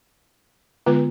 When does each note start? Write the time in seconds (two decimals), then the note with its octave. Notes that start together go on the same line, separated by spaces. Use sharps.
0.86 D3 G#3 B3 F4 B4